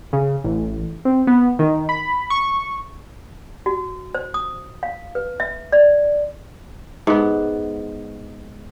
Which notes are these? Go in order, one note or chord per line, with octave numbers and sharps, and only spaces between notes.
C#3
A1
C4
B3
D#3
B5
C#6
F#4
C5
D#6
F5
B4
E5
D5
G#2 B3